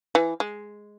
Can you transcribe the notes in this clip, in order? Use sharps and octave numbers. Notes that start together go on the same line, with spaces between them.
E3
G#3